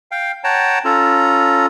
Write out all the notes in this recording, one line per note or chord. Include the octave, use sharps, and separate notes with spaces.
F5 G5
C#5 F#5 G5 A5 A#5
C#4 F4 A4 A#5